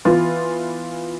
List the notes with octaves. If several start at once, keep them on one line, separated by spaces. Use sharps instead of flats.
E3 B3 F4